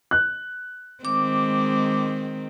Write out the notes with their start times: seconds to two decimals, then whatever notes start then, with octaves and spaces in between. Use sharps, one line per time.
0.11 F#6
1.05 D#3 G#3 C4 D6